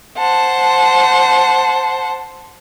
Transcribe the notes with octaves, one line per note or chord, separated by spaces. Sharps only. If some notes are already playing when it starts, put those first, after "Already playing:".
C5 F#5 A5